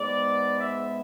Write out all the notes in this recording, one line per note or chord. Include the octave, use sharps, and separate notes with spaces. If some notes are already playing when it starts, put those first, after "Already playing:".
Already playing: G#2 G#3 B3 D5
E5